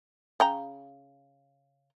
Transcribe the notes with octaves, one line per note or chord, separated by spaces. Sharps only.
C#3 G5 A#5